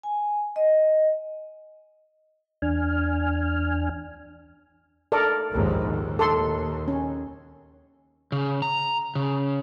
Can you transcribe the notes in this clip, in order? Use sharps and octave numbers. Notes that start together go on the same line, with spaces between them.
G#5
D#5
E2 D4 G#5 F6
A4 A#4 D5
A#1 D#2 G#2
D#2
A4 C6
C#4
C#3
A#5
C#3